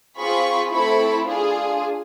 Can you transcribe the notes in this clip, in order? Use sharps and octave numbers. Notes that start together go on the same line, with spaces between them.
C4 F4 G#4 B5 C#6
A3 C4 E4 A4 B5 C#6
D4 F4 G#4